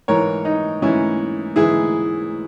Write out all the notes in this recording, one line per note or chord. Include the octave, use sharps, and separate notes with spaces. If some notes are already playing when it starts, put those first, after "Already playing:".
G#2 E3 A#4 C#5
D#4
G#2 E3 C#4 E4
G#2 E3 E4 G#4